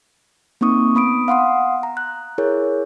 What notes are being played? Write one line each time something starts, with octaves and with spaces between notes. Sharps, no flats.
A#3 C4 D#4 C#6 D#6
B3 B5 D#6 D7
F5 F#5 C6 D#6
A#5
F#6
E4 G#4 A#4 C#5